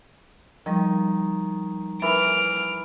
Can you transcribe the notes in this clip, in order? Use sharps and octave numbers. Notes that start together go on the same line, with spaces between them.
D#3 F3 G3
E3 A#4 F6 D7